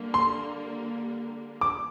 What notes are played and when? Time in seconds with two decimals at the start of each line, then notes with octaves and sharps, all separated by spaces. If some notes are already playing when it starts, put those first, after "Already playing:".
Already playing: D3 G3 A#3
0.14 C6
1.61 D6